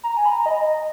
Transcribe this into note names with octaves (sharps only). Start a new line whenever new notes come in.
A#5
G#5
B5
A#5
D#5
D#5